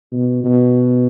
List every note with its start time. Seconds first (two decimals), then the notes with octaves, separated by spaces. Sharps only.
0.12 B2
0.44 B2